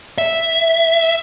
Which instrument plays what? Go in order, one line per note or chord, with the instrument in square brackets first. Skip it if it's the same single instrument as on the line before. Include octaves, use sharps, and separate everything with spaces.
[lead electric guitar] E5